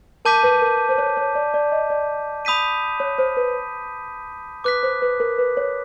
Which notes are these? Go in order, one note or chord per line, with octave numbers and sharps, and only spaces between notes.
A#4 A5 D6 G6 B6 D#7
B4
A#4
C5
C#5
C#5
D5
D5
D#5
D5
B5 D#6 G6 B6 D#7
C#5
C5
B4
B4 D6 F#6 B6
C5
B4
A#4
B4
C#5